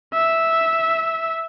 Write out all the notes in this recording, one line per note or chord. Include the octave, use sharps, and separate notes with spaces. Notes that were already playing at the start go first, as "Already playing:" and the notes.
E5